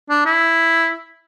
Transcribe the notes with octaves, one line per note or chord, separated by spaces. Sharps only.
D4
E4